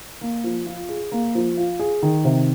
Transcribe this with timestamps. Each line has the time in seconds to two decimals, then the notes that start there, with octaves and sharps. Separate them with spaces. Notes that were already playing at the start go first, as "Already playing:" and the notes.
0.21 A#3
0.44 F3
0.66 F4
0.89 G#4
1.12 A#3
1.35 F3
1.57 F4
1.80 G#4
2.03 D#3
2.25 C3